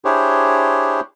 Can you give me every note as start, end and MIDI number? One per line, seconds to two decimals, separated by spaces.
0.05 1.00 62
0.05 1.00 64
0.05 1.00 67
0.05 1.00 68
0.05 1.00 72
0.05 1.00 73